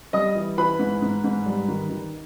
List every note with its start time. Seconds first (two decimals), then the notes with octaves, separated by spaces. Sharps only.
0.13 G3 D#5 D#6
0.35 E3
0.58 E3 B4 B5
0.79 G#2
1.02 G#2
1.24 G#2
1.46 G3
1.68 D#3
1.90 D#3